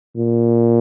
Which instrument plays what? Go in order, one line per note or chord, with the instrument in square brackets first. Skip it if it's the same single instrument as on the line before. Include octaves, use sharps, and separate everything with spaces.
[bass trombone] A#2